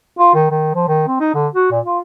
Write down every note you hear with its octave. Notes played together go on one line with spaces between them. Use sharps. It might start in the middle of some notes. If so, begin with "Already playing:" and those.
F4
D#3
D#3
F3
D#3
C4
D#4
D3
F#4
A#2
F4